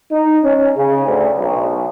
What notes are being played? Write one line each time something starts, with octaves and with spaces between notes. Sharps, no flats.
D#4
C#4
C#3
D2
B1